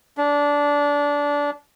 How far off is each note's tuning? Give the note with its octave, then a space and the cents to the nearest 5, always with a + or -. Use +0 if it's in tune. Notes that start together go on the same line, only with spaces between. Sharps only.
D4 -20